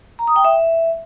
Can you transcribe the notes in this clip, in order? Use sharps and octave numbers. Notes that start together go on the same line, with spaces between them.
A#5
D#6
G5
E5